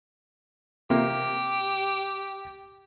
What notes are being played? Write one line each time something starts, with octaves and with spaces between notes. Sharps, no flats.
C3 A#3 G4